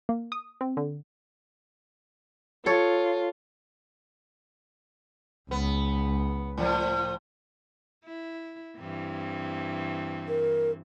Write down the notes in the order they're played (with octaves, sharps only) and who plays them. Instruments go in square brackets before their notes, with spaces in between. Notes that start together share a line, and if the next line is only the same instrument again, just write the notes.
[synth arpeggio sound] A#3
D#6
C4
D3
[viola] F4 [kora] A4 C#5
[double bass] C#2 [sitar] B3
[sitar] A2 F3
[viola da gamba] E4
G2 E3 C4
[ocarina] A#4